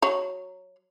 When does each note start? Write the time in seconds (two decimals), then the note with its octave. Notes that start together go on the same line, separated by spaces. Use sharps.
0.02 F#3 C#5